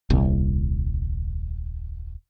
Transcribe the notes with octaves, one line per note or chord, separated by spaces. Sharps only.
D#1 C2